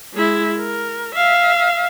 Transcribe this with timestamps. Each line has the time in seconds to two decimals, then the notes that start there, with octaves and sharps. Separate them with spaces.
0.13 G#3 E4
0.58 A#4
1.15 E5 F5